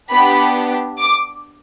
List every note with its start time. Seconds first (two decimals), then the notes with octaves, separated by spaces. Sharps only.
0.11 B3 D4 G4 B5
0.99 D6